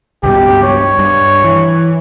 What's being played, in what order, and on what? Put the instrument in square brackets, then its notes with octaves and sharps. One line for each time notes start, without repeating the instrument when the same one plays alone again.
[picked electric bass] C#2 G2 B2 [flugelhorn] G4
[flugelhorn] C#5
[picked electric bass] G2
E3